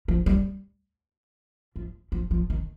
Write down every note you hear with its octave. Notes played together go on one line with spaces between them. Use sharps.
F3
G3
F3
F3
F3
D#3